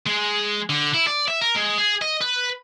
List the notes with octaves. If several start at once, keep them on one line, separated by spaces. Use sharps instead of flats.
G#3
D3
E4
D5
E5
A#4
G#3
G#4
D#5
B4